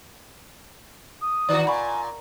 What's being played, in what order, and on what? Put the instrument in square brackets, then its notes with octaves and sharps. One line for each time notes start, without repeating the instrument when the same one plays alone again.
[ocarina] D#6
[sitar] D#3 B3 F#4 [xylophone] D5
[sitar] A#2 [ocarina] G#5 [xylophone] B5 C#6